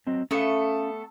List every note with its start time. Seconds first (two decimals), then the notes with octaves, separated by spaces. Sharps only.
0.07 F#3 C4 D#5
0.31 A3 B3 C#4 A4 F5